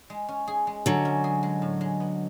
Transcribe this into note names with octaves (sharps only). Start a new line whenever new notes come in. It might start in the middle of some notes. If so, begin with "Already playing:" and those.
G#3
C#4
G#4
G#3
D3 F#3 G#3
C#4
G#4
G#3
A2
G#3
B3